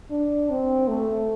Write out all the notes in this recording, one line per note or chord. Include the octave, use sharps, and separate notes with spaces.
D4
C4
A3